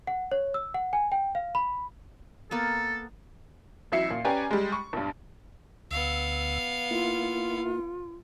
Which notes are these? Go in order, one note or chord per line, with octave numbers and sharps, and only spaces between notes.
F#5
C#5
E6
F#5
G#5
G5
F5
B5
A#3 B3 A4
A1 F#3 E4 E5 C7 C#7
A#2
C#4 G4 B4 D5 G#5 A#5
G3 G#3
C#6
B1 G2
D2 B3 F5 E6
A#3 E4 F4